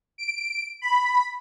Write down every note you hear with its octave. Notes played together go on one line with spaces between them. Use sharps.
D7
B5